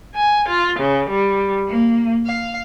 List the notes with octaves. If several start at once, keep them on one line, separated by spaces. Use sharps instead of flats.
G#5
F4
C#3
G3
A#3
F5